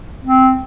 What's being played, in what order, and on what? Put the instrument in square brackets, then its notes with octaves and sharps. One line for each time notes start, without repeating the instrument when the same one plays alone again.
[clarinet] C4